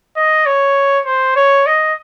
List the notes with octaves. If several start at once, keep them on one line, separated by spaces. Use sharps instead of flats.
D#5
C#5
C5
C#5
D#5